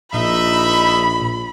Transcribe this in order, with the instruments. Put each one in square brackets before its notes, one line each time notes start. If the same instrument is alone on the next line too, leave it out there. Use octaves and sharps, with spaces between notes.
[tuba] A#1 [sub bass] A#2 [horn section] D#4 D#5 E5 [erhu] B5